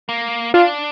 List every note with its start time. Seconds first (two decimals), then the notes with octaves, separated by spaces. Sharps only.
0.09 A#3
0.54 D4 F4